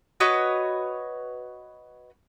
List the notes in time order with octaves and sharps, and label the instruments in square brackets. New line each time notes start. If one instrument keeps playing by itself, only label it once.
[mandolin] F#4 B4 C#5 D#5